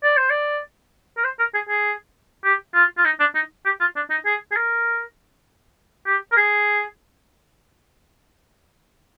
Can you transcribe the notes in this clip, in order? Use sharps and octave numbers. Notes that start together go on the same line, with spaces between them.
D5
C5
D5
A#4
C5
A#4
G#4
G#4
G4
F4
F4
D#4
D4
D#4
G4
F4
D4
D#4
G#4
G#4
A#4
G4
A#4
G#4